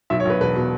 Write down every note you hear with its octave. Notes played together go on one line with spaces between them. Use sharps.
B1 E5
C#5
B1 B4
E1 B4
B2